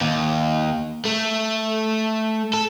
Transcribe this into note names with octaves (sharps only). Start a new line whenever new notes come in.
D#2
A3
A4